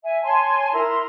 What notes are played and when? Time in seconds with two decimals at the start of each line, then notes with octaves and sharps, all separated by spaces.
0.03 E5 G#5
0.23 C#5 G#5 A5 C6
0.72 E4 A#4 A#5 C6